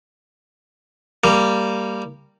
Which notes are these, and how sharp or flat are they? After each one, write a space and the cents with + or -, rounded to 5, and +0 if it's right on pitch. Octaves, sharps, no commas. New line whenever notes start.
G3 +0 A#3 -15